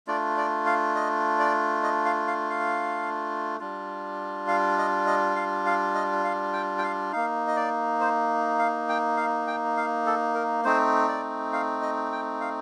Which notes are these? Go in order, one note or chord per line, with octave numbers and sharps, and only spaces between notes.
A3 D4 F4 D5
D5
F5
D#5
D5
D#5
F5
F5
F5
G3 D4 F4
F5
D#5
D#5
F5
F5
D#5
F5
G5
G5
F5
A#3 D#4 F5
D#5
D5
C5
F5
G5
F5
G5
F5
A4
A#4
A3 C4 D#4 C5
D5
F5
D#5
G5
F5